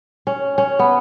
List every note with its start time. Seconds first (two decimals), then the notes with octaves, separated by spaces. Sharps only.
0.27 C#4
0.58 C#4
0.79 B3